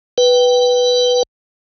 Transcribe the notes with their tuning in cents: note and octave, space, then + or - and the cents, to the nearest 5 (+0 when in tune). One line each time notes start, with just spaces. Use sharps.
B4 +0 G5 -5